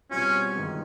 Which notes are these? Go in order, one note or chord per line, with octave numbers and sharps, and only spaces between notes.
B2 G3 C4 C#4 F4
G1 G2 D#3 G#3